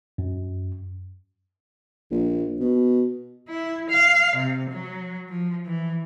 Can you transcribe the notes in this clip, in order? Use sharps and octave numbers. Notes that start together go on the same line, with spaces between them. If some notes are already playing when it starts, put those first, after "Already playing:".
F#2
A#1
B2
E4
F5
C3
F#3
F3
E3